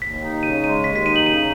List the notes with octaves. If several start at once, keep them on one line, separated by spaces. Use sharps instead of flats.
D#2 B6
D#4
C#3 D#7
G#3 D#7
D#2 B6
B6
D#4 D#7
F#7
C#3 D#7